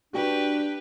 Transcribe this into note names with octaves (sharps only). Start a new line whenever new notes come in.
D4 F#4 G4 B4 G5